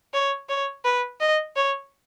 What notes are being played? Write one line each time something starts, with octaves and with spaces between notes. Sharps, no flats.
C#5
C#5
B4
D#5
C#5